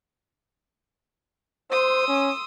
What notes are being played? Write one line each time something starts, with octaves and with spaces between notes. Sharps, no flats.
C5 C6 D#6 E6
C#4